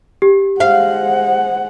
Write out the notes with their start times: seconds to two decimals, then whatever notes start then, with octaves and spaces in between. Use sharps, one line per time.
0.22 G4
0.60 G#3 C5 F5 F#5